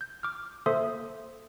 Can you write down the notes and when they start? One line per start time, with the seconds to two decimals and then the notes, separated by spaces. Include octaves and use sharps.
0.01 G6
0.23 D6 F6
0.66 A#3 A4 C5 E5 C6 D#6